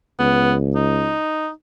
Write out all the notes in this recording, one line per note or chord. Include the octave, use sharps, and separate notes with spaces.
C#2 B3
D#4